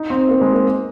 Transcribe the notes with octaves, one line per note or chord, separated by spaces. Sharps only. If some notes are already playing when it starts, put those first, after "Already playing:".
Already playing: D#4
C4
A#3
G#3
A#3